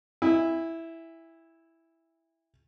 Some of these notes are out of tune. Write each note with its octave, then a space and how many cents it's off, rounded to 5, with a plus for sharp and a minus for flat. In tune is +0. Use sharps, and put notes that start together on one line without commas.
E4 +0 G#5 -40